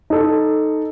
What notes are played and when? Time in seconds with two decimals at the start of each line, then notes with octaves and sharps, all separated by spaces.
0.10 D#4 A4